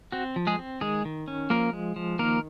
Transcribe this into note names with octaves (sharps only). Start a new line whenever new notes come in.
C4 F#4
F3
G#3 G#4
C4
D#3 G#3 G#4
D#3
C#4
F3 A#3 A#4
G#3
F3
D#3 A#3 A#4